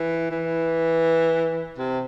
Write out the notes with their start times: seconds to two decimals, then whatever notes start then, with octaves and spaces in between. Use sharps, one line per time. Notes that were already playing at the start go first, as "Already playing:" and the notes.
Already playing: E3
0.31 E3
1.78 C3